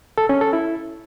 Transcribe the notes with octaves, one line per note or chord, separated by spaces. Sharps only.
A4
C#4
A4
E4